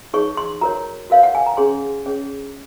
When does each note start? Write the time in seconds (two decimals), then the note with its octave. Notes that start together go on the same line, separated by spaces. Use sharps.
0.13 D#4 G#4 C#5 C#6
0.37 C6
0.61 F#4 A#4 C#5 A#5
1.10 F#4 A#4 C#5 F5
1.23 F#5
1.35 G#5
1.46 A#5
1.57 C#4 G#4 C#5 C6
2.06 C#4 G#4 C#5